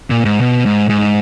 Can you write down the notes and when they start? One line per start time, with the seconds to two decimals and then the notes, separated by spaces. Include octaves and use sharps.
0.10 A#2
0.25 G#2
0.41 B2
0.66 G#2
0.89 G#2